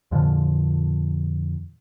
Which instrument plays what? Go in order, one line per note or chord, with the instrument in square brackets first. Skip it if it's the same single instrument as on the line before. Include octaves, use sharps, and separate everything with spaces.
[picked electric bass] F2 A#2 D3 F3